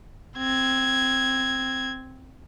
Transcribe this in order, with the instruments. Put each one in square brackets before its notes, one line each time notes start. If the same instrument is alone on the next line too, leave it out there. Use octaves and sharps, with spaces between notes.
[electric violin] C4 G#6